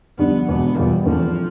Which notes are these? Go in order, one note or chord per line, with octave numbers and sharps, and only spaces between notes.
F2 D3 G3 B3 D4
E1 E2 B2 B3
E2 B2 G3 B3 F4
E2 D3 F3 A3 C4